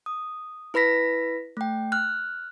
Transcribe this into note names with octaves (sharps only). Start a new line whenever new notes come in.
D#6
E4 B4 B5 A#6 B6
A3 G5
F6 F#6